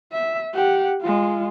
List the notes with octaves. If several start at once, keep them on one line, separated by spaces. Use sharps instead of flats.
E5
G4 F#5
G#3 F4